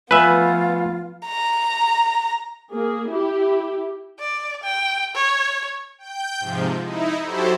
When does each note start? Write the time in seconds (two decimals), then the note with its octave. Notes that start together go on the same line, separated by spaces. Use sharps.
0.11 F3 A3 B3 F4 B4 C#5 E5 G#5
1.27 A#5
2.74 A#3 G#4
3.10 E4 G4
4.20 D5
4.64 G5
5.15 C#5
5.98 G5 G6
6.40 G#2 C3 F3
6.81 D#4 E4
7.23 F#3 E4 F#4 G4 A4 C5